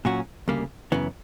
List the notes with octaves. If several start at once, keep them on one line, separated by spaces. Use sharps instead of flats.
A#2 F#3 C#4 F#4
D2 C#3 G3 A#3
F#2 C#3 E3 B3